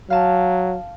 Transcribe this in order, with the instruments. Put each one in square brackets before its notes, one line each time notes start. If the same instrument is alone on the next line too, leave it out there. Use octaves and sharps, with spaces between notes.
[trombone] F#3 [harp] F5 A5